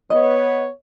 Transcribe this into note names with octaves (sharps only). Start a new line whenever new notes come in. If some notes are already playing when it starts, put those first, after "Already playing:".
B3 C#5 D#5